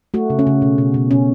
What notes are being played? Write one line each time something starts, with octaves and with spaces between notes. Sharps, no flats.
A3 F#4
C#3
C#4
C#3
B2
B2
B2
B2 C#4